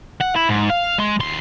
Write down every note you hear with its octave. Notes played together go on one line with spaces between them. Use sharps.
F#5
E4
G#2
F5
G#3 C6
D#2 C6